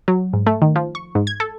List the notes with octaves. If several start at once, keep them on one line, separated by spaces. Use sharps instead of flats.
F#3
G#2
A3
D#3
F3
C#6
G#2
G#6
A4